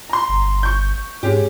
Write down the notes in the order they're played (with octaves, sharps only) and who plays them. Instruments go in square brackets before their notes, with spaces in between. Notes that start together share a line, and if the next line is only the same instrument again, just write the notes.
[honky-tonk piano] A#5 C6
[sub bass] G1
[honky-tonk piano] C#6 G6
[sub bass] G#2 [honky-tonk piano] G#3 C#4 G4